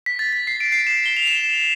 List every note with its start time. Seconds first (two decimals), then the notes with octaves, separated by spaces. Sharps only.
0.06 B6
0.19 A6
0.33 B6
0.47 C7
0.60 D7
0.72 C7
0.87 E7
1.06 G7
1.16 F7
1.27 E7